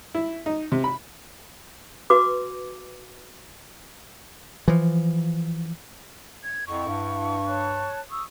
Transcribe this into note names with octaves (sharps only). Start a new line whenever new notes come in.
E4
D#4
C3
B5
F#4 B4 D6
E3 F3
G#6
F2 E4 F#5 C#6
G2
C#5 A5 F#6
C#6 D#6 E6